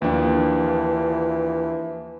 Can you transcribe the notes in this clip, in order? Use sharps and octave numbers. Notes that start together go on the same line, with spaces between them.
D#2 E3 F3 D4